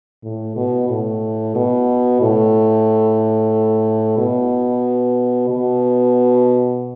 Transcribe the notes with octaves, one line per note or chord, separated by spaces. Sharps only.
A2
B2
A2
B2
A2
B2
B2